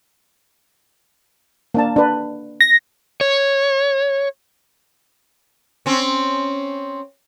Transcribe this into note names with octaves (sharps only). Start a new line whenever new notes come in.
A#3 D4 A5
D4 B4
A#6
C#5
C4 C#4